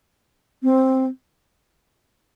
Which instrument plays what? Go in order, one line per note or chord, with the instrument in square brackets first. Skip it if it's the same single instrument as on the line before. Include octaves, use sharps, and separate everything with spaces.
[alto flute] C4